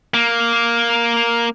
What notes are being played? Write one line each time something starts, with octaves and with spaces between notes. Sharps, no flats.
A#3